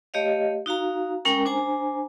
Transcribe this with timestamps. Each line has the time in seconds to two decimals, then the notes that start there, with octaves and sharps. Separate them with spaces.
0.14 A3 G4 C#5 D#5 F5
0.66 D#4 F#4 F5 A#5
1.25 G#3 C#4 A#4 G5 A#5
1.45 D4 C5 G#5 A#5